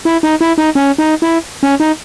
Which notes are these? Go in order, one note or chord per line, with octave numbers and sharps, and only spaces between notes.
E4
D#4
E4
D#4
C#4
D#4
E4
C#4
D#4